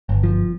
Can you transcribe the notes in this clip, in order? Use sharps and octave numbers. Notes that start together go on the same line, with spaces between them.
G1
F3